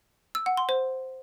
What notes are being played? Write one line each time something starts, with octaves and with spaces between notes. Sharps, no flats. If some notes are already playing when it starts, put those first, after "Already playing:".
E6
F#5
C6
C5